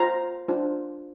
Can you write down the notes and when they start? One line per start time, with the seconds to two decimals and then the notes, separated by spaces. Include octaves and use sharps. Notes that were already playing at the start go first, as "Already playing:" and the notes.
Already playing: F4 C5 A#5
0.48 D4 F4 C5